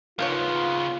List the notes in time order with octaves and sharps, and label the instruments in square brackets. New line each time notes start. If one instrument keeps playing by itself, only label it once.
[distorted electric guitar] C#3 B3 [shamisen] A#3 D#4 C#5 [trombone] F4